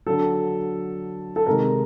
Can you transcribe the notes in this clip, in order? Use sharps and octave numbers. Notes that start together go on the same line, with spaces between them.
D3 F#3 A4
A4
C3 D#3 G#3 A#4